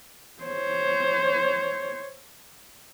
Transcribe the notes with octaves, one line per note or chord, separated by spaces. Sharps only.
C5 C#5